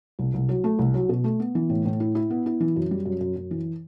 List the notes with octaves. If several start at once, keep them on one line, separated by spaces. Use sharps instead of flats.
C2
C2
F#3
A3
C2
F#3
B2
A3
B3
E3
A2
A2
E4
E4
B3
E4
E3
F#2
G3
F#2
F#2
F#2
E3